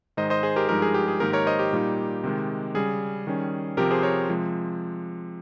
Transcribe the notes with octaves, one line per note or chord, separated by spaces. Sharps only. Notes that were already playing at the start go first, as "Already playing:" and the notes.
G#2 D#3 G#3 D#4 C5 D#5
C5 D#5
G#4 C5
G4 A#4
G2 F3 G#3 D#4 G4 A#4
G#4
G4
G#4
G#2 D#3 A#3 D#4 G4 A#4
A#4 C#5
C5 D#5
G4
A#2 G3 A#3 D#4
C3 D#3 G#3
C#3 G3 C#4 G#4
D#3 G3 C#4
C3 F3 C4 G4 A#4
G#4 C5
A#4 C#5
C3 F3 G#3